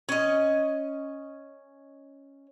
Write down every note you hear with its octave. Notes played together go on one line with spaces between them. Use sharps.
C#4 D#5